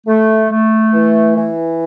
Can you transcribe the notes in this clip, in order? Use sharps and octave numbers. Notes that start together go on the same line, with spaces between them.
A3
A3
E3
E3